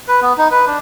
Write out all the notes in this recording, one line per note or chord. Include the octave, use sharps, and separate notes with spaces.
B4
B3
D#4
B4
D4